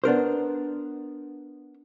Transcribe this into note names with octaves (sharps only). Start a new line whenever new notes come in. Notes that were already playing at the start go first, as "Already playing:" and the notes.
B3 D4 A#4 C5